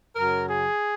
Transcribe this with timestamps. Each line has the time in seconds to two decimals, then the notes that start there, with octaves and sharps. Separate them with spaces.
0.15 F#2 C#3 F#3 A#4
0.47 G#4